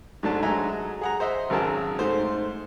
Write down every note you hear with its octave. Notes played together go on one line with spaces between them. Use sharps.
G#2 F#3 A3 D4 A5
F#3 G#3 A4 E5 G#5 A#5
G#4 F#5 A#5
C5 D#5 E5 F#5
G#1 C#3 F#3 G#4 A#4 A5
G#2 A3 C5